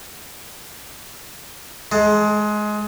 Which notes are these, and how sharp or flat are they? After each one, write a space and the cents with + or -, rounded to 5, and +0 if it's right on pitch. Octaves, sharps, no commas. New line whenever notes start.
G#3 +20 A5 +45